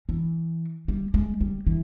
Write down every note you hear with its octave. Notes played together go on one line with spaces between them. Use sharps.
E3
G3
G#3
G3
E3